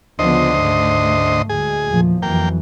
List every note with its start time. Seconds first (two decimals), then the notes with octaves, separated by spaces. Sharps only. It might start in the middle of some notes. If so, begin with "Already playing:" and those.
0.19 D2 C#3 F3 B3 C5 D#5
0.57 G#2 C#3 A3
1.49 D2 A2 G#3 G#4
1.89 E2 A#2 F3
2.22 F2 E3 F#3 A#3 G5